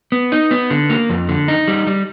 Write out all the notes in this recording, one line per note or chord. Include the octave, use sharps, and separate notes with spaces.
B3
D#4
B3
D3
A#3
F2
D3
D#4
G3
G3